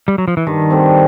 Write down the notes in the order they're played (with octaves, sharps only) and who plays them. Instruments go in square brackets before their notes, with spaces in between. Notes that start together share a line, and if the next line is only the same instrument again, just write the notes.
[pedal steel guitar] G3
F#3
F3
E3
[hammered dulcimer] G2 [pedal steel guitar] D#3
[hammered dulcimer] D3 G3 C4